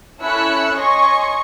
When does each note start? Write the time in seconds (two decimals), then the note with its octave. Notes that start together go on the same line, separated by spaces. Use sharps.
0.22 C#4 E4 A4 E6 F#6 C#7
0.77 C#5 D#5 G#5 C6 C#6